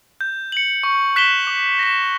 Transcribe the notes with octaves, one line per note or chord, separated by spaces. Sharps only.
G6
C#7 F#7
C#6
F#6 B6 E7 G7
D6
A#6 E7